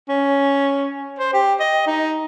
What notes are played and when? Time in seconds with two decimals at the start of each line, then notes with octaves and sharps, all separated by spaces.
0.09 C#4
1.19 C5
1.34 G4
1.60 D#5
1.87 D#4